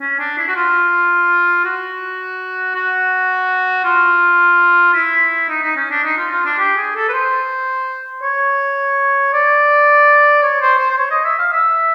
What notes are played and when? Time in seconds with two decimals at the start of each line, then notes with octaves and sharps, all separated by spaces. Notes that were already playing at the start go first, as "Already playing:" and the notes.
0.01 C#4
0.19 D4
0.37 E4
0.48 F#4
0.56 F4
1.65 F#4
2.75 F#4
3.84 F4
4.94 E4
5.50 D#4
5.62 D#4
5.76 C#4
5.91 D4
6.04 D#4
6.17 F4
6.31 F4
6.46 D4
6.59 G4
6.77 G#4
6.95 A4
7.09 B4
7.13 C5
8.23 C#5
9.33 D5
10.43 C#5
10.61 C5
10.79 C5
10.90 C5
10.98 C#5
11.11 D#5
11.25 E5
11.39 F5
11.53 E5